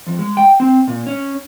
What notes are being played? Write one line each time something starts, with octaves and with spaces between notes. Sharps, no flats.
F2
G#3
G5
C4
A#2
C#4